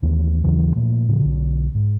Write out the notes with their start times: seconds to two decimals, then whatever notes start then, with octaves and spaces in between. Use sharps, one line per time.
0.02 D#2 E3 A3 B3
0.44 D#2 C#3 E3 F#3
0.76 A#2 F3 A3 A#3
1.08 A2 C#3 E3 F3
1.20 B1 D3
1.75 G#2